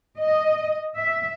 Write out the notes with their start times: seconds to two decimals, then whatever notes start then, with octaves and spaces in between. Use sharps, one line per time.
0.19 D#5
0.97 E5